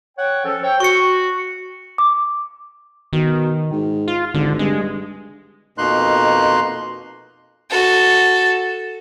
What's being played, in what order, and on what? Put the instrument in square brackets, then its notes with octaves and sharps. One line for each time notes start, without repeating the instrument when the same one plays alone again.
[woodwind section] C#5 F#5 G5
F3 C#4 A4
C5 C#5 G5
[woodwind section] F#4 [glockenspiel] C#6 C#7
[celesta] D6
[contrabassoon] B2 [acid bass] D#3
[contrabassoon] G#2
[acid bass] F4
[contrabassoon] G#1 [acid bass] D3
[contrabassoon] G2 [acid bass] G#3
[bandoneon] F2 B2 A#3 D#4 C6 F#6
[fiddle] F#4 A4